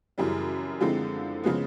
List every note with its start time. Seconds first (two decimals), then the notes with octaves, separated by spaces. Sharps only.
0.18 F#2 C#3 E3 G3
0.81 D3 F3 G#3 C4 E4
1.44 C#3 F3 G#3 B3